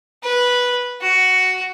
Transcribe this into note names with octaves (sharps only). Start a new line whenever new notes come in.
B4
F#4